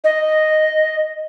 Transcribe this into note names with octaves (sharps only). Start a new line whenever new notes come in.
D#5